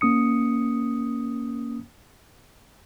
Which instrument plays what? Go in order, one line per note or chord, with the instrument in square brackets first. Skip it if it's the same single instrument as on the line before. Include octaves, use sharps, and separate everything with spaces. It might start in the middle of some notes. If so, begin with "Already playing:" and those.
[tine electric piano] A#3 C#4 D#6 C#7